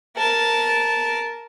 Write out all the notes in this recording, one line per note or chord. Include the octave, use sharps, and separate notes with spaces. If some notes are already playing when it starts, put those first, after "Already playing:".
A#4 A5